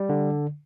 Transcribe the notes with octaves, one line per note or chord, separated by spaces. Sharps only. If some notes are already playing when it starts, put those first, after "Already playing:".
Already playing: G3
D3